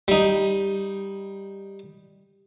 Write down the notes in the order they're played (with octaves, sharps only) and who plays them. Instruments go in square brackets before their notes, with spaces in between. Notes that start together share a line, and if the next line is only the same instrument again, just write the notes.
[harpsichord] G3 D#4